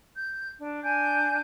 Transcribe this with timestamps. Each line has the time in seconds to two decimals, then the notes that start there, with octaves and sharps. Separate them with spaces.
0.15 G6
0.58 D4
0.83 D4 G#5 G6